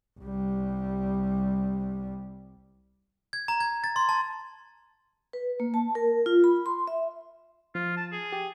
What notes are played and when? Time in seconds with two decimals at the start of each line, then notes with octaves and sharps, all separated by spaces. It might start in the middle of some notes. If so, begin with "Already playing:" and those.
0.20 C2 G3
3.33 G#6
3.48 A#5
3.60 G#6
3.84 A6
3.96 C6
4.09 A5
5.33 B4
5.60 A#3
5.74 A5
5.95 A#4
6.26 F4
6.44 B5
6.66 C6
6.87 E5
7.75 F3 F4
7.97 A5
8.12 G#4
8.32 G4